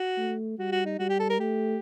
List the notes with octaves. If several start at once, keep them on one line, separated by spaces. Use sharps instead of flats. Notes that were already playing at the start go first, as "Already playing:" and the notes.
Already playing: F#4
A3
G3 F#4
F#4
D#4
G3 F#4
G4
A4
A#4
A3 G4